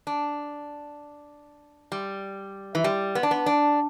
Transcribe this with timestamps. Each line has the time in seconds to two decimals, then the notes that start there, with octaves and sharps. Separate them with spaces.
0.07 D4
1.92 G3
2.75 E3
2.84 G3
3.15 B3
3.23 D4
3.31 B3
3.46 D4